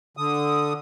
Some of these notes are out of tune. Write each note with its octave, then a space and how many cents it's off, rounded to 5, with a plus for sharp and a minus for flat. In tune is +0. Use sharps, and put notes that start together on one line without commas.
D3 +0 D#6 +0